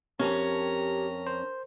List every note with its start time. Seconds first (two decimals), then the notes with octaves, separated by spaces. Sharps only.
0.19 F2 C#4 G4 A#4 C#5 A#5
1.27 C5